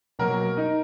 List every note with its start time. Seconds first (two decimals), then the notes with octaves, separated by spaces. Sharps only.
0.19 B2 F#3 A#3 A#4
0.57 D#4